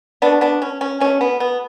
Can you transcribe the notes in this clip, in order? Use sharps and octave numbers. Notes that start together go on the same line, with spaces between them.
B2 A3 B3 D4
B3 D4
C#4
C#4
B2 A3 C#4
B3
B3